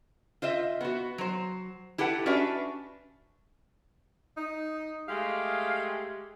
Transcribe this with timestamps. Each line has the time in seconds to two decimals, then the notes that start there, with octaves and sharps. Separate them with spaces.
0.42 F4 C5 D#5 E5
0.81 B3 F#4
1.18 F#3 C5
1.98 E4 G4 A4 B4 F#5
2.26 C#4 D4 F#4 B4 D5 E5
4.37 D#4
5.08 G#3 A3 G4 F5